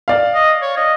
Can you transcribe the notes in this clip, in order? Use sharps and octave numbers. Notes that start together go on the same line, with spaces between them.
D5 F5
D#5
C#5
D#5